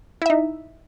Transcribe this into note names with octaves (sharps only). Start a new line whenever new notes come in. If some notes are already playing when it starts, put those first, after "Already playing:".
D#4 E4 E5